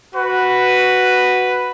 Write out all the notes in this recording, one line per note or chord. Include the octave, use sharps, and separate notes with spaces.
F#4 B4